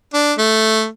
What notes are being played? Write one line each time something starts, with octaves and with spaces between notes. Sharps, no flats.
D4
A3